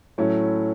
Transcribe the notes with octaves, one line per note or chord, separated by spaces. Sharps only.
A2 F#3 A3 C#4 E4